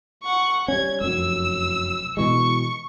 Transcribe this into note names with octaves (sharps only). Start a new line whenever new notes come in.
F#5 C#6
G3 C#4 G#6
F1 F#2 E6
B2 E3 G#3 C#6